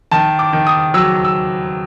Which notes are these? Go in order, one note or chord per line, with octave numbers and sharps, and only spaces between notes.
D#3 A5
D6
D#3
D#6
F#3 E6
E6